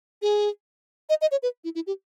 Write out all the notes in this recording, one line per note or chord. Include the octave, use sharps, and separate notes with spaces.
G#4
D#5
D#5
C#5
B4
E4
E4
G4